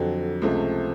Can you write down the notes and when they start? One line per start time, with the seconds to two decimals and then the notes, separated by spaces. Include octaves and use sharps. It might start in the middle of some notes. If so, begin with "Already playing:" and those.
Already playing: F2 D3 F#3
0.42 C#2 C3 F3 A3